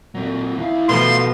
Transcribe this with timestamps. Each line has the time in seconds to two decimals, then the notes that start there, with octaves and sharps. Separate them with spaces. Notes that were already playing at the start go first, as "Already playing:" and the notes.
0.15 A#2 F#3 C4
0.58 D#2 E4 F5
0.89 B2 F3 A3 C6